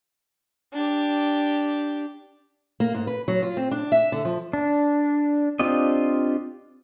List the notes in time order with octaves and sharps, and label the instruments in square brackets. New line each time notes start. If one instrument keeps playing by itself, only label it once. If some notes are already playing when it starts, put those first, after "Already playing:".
[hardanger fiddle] D4 G4
[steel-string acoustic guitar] A#3
G#2
B4
F#3
F4
C4
D4
E5
D3
F3
[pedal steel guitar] D4
C4 D4 F4 G4 D#5